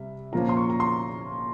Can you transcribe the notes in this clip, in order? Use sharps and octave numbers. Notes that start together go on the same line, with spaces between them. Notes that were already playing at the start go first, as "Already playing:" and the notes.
Already playing: C3 G3 E5
A#2 F3 A#3 C#4 A#5
C6
C#6
A#5
C6